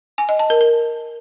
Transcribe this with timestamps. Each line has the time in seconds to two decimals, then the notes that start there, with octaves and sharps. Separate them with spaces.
0.18 G#5
0.29 D#5
0.39 A5
0.50 A#4
0.61 A#4